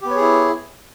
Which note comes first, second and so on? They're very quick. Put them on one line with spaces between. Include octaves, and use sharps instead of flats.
G4 B3 C#5 G#4 E4